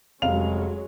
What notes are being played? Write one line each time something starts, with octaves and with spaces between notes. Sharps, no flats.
F1 F#3 G#3 C#4 F5 F7